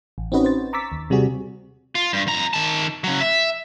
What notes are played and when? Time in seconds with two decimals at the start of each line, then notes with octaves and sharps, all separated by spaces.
0.18 A1
0.32 C4 C#4 D#4 F#4 B4 D#5
0.44 C5 A6
0.73 A#5 C#6 D6 E6 A6 B6
0.92 D#2
1.10 C3 G3 C4 F#4 G#4
1.95 F4
2.13 G2
2.27 F2 A#5
2.53 D#3 A5
3.04 C#3 F#3
3.21 E5